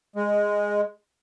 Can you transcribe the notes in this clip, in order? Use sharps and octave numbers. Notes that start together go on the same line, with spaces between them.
G#3